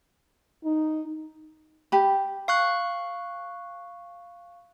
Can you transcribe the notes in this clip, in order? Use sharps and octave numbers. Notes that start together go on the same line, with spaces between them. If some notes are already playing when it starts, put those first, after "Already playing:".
D#4
G4 B5
F5 C#6 F#6